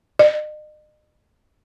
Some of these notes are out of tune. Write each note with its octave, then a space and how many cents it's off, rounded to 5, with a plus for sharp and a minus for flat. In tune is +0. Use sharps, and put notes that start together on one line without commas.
D#5 -40